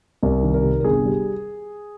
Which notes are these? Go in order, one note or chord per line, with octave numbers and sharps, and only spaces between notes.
C2 A#4
D#3
A#4
C3
A#4
G1 G#4
G3